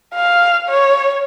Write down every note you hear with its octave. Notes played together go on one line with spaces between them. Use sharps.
F5
C#5